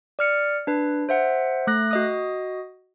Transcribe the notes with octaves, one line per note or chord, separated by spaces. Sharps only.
D5 F6 C#7
D4 B4
C5 E5 F#5
A3 F#6 A#6
F#4 D#5 D#6